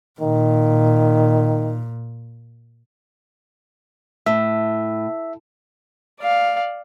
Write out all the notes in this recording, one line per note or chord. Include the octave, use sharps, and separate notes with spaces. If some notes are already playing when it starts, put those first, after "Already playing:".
A#2 D#3
A2 E5
D5 F5